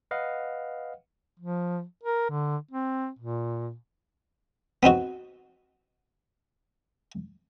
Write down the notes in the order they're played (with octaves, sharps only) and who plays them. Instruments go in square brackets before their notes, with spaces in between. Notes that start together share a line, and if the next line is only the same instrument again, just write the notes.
[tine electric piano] B4 D#5 F5 F#5
[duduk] F3
A#4
D3
C4
A#2
[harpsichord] B3 C4 D#4 F#4